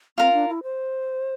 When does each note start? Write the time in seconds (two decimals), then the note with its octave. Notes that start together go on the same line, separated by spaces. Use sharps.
0.18 C4 F4 A#4 F5 A#5
0.33 D4
0.48 E4
0.63 C5